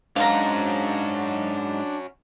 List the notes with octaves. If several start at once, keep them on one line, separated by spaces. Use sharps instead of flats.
G#2 C#4 D4 F#4 F5 A#5